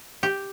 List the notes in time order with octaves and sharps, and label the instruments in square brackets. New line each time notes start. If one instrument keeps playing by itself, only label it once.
[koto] G4